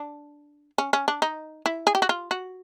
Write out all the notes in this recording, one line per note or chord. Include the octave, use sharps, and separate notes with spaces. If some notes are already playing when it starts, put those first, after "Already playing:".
Already playing: D4
C#4
C#4
D4
D#4
E4
G#4
G4
F#4
F4
F#4